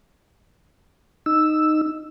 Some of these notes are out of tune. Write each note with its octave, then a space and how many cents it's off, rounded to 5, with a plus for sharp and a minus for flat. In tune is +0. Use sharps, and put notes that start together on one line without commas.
D#4 -10 E6 +0